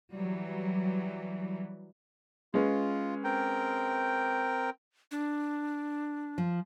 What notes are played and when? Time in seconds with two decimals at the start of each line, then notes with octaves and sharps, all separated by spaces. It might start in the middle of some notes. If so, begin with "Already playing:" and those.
0.13 E3 F#3 G3
2.54 G#3 C#4 F4 B4
3.24 C4 A#4 G5
5.11 D4
6.38 F3